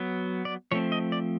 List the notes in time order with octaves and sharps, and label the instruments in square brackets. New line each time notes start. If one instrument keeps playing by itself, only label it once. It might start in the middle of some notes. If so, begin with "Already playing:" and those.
Already playing: [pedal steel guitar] F#3 B3
D5
F3 A3 C4 C#5
D#5
D5